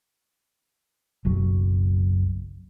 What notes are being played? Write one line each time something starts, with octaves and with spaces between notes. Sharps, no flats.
F#1 B1 F#3